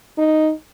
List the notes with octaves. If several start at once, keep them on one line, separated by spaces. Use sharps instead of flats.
D#4